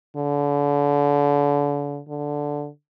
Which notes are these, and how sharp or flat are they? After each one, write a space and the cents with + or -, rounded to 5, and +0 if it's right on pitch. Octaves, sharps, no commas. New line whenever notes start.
D3 -35
D3 -5